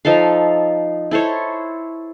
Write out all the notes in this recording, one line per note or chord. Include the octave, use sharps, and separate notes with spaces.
F3 D#4 A4 F5
E4 A4 C5 C#5